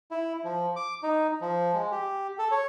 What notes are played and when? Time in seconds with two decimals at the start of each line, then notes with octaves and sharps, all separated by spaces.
0.11 E4
0.44 F3
0.76 D6
1.03 D#4
1.41 F3
1.74 G#3
1.91 G4
2.39 A4
2.51 C#5